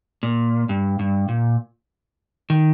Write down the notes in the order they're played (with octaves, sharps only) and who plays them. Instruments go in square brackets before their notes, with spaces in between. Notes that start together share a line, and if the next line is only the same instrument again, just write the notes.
[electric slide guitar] A#2
G2
G2
A#2
D#3